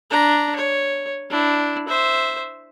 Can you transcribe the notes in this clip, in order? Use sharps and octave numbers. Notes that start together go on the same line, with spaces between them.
D4 A#5
C#5
D4 E4
C5 E5